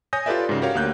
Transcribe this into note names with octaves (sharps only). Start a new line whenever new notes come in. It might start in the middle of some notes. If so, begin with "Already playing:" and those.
C#5 G#5 D#6 G6 A#6
F4 G4 A4 B4 D5 E5
G#2 C#3
F#4 G4 A#4 C#5 F5
D2 A#3 F#6 G6